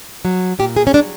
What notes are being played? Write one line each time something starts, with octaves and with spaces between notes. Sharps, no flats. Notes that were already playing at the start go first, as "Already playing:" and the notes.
F#3
A#2 G4
G#4
C#4
F#3 D4